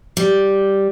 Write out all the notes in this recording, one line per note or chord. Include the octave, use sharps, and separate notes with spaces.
G3